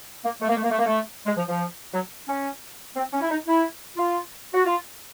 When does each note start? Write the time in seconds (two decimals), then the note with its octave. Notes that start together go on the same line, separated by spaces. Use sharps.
0.24 A#3
0.41 A3
0.49 A#3
0.56 A3
0.63 A#3
0.71 A3
0.78 A#3
0.86 A3
1.26 G#3
1.37 F3
1.49 F3
1.93 F#3
2.28 C#4
2.96 C4
3.13 C#4
3.21 E4
3.30 D#4
3.47 E4
3.97 F4
4.53 F#4
4.65 F4